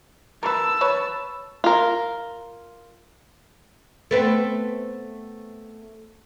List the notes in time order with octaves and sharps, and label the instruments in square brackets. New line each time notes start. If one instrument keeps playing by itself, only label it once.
[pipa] A#4 B4 [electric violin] A5 E6
[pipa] B4 C#5
[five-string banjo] F4 A#4
[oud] A3 B3 C4